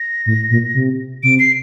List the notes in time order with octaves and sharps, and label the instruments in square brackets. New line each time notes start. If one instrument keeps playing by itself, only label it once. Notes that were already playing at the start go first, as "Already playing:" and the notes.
Already playing: [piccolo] A#6
[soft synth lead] A2
A#2
C3
[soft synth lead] C3 [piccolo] D7
[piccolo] C7